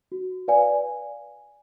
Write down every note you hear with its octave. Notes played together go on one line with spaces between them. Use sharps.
F#4
B4 D5 F5 G#5